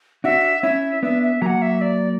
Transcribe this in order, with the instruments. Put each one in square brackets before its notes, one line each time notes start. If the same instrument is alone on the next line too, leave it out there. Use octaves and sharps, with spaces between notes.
[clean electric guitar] D4 F#4 [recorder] E5
[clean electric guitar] C#4 E4 [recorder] E5
[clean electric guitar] B3 D4 [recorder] E5
[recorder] E5
[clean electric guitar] F#3 A#3 [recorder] F#5 A#5
[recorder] E5
D5